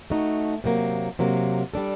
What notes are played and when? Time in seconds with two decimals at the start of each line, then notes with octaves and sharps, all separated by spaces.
0.10 A3 D#4 F#4
0.64 C3 F#3 A#3
1.19 C3 F#3 A#3
1.74 G3 D4 A4